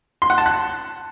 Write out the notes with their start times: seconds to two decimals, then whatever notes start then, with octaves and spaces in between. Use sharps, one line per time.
0.22 C6
0.30 F#5
0.38 A5
0.46 F#6